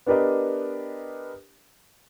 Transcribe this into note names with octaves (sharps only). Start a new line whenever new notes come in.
B3 D4 G4 A#4 B4 D#5